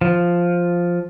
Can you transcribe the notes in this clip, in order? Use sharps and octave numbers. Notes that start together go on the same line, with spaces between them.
F3